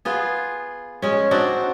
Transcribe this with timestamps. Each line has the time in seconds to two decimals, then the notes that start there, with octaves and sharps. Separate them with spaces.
0.05 B3 F4 G#4
1.02 G#3 C#4
1.31 C4 D4 D#4 F#4